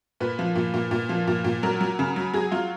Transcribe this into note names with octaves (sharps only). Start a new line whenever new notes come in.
A#2 B4
F3
A#2
A#2
A#2
F3
A#2
A#2
F#3 A#4
F#3
C#3
F#3
F#3 G#4
F#3 F4